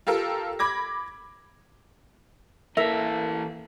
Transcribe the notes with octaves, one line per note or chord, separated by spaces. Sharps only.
F4 G4 A4 A#4
B5 D6 G#6 A#6
E3 A#3 A4 A#4 E5